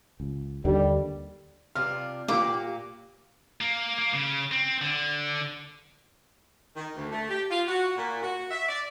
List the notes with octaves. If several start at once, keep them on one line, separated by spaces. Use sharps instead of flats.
C#2
D#2 D3 D#3 G3
C3 D4 F4 F6
A#2 A#3 G4 F#5 D6
A#3
A#3
C#3
C4
D3
D#3
D2
A3
G4
F4
F#4
A#2
F#4
E5
D5